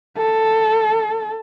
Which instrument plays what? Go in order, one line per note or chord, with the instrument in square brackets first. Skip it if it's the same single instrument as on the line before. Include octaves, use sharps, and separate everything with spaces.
[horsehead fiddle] A4